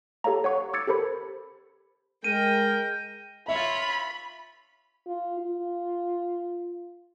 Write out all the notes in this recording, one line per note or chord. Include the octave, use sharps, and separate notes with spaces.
G4 A4 C#5 F5 A#5
C#5 F#5 C#6
D6 E6 G#6 A6 C#7
G4 A4 A#4 C5 B5
G#3 A#4 G5 D#7
F4 C#5 E5 B5
F4
F4